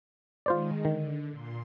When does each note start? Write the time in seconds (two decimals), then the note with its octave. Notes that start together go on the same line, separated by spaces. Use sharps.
0.46 D#3 G#3 F4 C5 D5
0.85 D3 D#3
1.30 A#2 C6